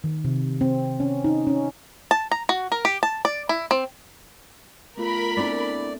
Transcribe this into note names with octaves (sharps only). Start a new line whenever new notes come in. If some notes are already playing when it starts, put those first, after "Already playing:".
D#3
C3
C4
C#4
D#4
C#4
A5
A#5
F#4
A#4
G4
A5
D5
E4
C4
A3 B3 F4 A#4 B5
A3 B3 C4 D4 E4 D5 D7